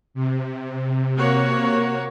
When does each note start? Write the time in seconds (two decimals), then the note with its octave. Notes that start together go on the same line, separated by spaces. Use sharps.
0.14 C3
1.17 A#3 F#4 C#5